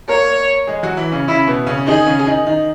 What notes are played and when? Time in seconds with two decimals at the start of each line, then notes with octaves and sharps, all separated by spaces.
0.09 A#3 A#4 C#5
0.67 G#3 G#4
0.83 F#3 F#4
0.97 E3 E4
1.12 C#3 C#4
1.28 C#3 C#4 E4
1.47 B2 B3
1.67 C#3 C#4
1.77 C#4
1.87 D#3 D#4 G#4
2.06 C#3 C#4
2.27 D#3 D#4
2.46 D#3 D#4